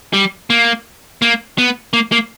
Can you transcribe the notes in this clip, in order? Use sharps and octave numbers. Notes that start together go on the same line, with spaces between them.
G3
A#3
A#3
B3
A#3
A#3